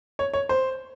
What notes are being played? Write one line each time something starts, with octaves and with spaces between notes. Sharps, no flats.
C#5
C#5
C5